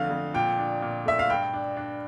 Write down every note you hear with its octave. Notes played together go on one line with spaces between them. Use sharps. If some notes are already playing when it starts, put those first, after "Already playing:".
Already playing: F2 D3 A3 F5
F2
A#2 G5
D4
A#2
A3 E5
F5
G2 G5
D4
D4